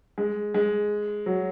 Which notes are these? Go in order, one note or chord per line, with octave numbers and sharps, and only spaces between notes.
G#3
G#3
F#3